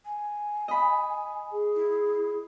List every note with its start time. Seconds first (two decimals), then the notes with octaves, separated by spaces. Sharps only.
0.05 G#5
0.68 D#5 B5
1.52 G#4
1.76 E4